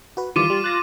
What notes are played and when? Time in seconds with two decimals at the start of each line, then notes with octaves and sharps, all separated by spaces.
0.17 F#4 B4
0.36 D#3 E3 G3 F4 D6 D#7
0.50 G3
0.64 F#6 A6 A#6